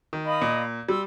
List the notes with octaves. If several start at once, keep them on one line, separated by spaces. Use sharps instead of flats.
D#3
D#5 F5 B5
A#2
G3 C6 E6